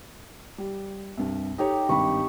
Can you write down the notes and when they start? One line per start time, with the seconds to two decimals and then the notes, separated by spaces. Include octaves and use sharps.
0.58 G3
1.17 C2 G2
1.58 D#4 G4 A4 C#5
1.89 G#1 G2 B5 C#6